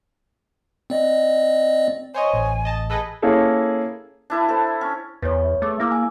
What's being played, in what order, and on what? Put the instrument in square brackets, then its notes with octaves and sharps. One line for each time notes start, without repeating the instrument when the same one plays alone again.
[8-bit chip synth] C4 D5 D#5
[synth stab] C5 C#5 D#5 [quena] G#5
[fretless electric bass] A1
[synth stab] D#5 A5
[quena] G#4 [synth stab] A4 B4 D#5
[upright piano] A#3 C#4 E4 G#4 A4
[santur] D4 E4 B4
A4 C5
C#4
[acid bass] E2 [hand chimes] B4 C#5
[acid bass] A3 [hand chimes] G#4 D6 E6
[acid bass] A#3 [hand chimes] E4 D6 E6
[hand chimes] G#5